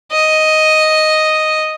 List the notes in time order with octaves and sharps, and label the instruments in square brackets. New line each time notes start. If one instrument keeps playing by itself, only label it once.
[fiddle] D#5